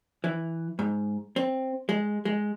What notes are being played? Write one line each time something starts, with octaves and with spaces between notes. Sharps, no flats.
E3
G#2
C4
G#3
G#3